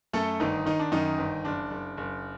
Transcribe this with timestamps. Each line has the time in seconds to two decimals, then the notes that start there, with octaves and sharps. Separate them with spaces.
0.13 F#2 A3 A4
0.40 G1 D#3 D#4
0.66 D#3 D#4
0.79 D4
0.92 F#2 D#3 D#4
1.18 G1
1.45 F#1 D4
1.71 F#1
1.97 F#1